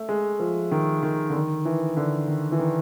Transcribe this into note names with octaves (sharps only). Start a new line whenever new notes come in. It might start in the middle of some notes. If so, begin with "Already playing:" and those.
Already playing: A3
G#3
F3
D#3
D#3
D3
D#3
E3
D3
D#3
E3
D#3